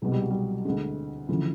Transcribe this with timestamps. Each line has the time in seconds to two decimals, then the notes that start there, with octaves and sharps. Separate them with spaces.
0.02 C2 B2 G#3
0.12 G3
0.21 F#3
0.30 G3
0.65 D2 D3 G#3
1.29 D2 C#3 E3 F3